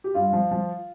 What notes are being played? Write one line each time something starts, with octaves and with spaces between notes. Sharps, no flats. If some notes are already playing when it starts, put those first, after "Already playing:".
G4
G2 F4
F3
F3